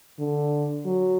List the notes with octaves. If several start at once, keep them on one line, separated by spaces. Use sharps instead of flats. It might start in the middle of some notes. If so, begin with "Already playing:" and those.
D3
F#3